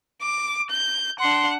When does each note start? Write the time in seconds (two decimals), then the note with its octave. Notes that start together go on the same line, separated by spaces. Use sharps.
0.22 D6
0.71 G6
1.20 D4 F#5 C6